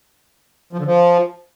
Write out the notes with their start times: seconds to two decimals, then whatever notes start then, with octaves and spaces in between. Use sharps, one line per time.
0.73 F3
0.80 D3
0.86 F3